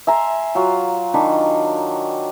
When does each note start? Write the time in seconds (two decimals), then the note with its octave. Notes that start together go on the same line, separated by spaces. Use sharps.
0.07 E5 G#5 A#5 C6
0.55 F#3 F4
1.14 D#3 D4 B5 C6